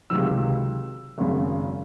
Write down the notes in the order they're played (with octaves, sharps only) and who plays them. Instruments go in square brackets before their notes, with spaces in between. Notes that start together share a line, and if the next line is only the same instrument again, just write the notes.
[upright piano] C#2 C3 D#3 F#3 E6
G#1 F#2 C#3